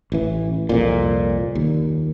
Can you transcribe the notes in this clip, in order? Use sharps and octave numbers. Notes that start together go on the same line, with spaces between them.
A1 E3
C2 F2 A#2
D#2